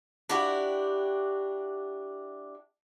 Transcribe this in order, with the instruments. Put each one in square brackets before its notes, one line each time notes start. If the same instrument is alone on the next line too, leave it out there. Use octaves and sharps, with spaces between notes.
[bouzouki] D4 E4 F#4 G4